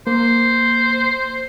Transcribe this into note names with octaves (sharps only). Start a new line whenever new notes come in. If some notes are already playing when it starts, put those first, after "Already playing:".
A#3 C5